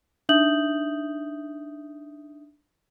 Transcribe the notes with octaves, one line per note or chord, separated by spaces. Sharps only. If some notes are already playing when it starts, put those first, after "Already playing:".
D4 D#4 E5 D#6 G6 F#7